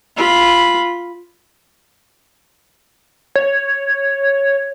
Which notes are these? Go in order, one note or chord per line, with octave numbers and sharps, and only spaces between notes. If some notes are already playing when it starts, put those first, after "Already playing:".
F4 B5
C#5